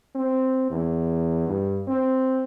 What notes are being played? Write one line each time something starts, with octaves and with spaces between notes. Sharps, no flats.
C4
E2
G2
C4